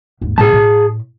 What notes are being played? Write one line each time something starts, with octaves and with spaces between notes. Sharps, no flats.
D#2 G#2
A2 A#3 G#4 A5
A2